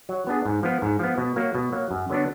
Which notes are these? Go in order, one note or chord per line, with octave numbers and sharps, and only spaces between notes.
F#3
B3 D4 G#4
G#2
F3 B3
G#2
F3 B3
B2
F#3 A#3
B2
F#3 A#3
F#2
D3 F#3 B3 D4